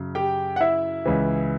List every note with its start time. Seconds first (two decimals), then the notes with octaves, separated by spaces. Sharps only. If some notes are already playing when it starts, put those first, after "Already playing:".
Already playing: F#2 C#3
0.15 G4 G5
0.56 F#5
0.61 E4 E5
1.05 C#2 C#3 E3